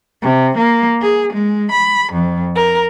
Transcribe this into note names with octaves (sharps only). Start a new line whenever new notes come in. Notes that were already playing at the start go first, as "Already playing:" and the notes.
C3
A#3
G#4
G#3
B5
F2
A#4